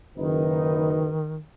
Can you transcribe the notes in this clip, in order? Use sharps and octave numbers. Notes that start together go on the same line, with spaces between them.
F#1 D#3 D#4 B4